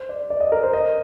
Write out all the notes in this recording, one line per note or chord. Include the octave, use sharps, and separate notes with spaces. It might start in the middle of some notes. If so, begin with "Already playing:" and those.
Already playing: C5
D5
D5
D#5
A#4
C5
D#5